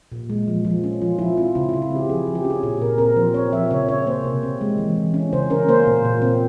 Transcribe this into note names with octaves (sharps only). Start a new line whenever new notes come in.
A#2
G#3
F3
F3
C#4
F3 F4
F3 E4
C4 F4
C#3 E4
F4
C#3
E4
C4 G4
F3 G#4
F3
G4
C#4
G#4
A#2 G#4
A#2 A#4
C4 A#4
F3 C5
C4 C#5
F3 E5
C#3 C#5
C#4 C#5
A#3 C5
C3
C4
G#3
E3
E3
C#4
C#3 C5
C#4 A#4
A#3 C5
A#2
A#2
C4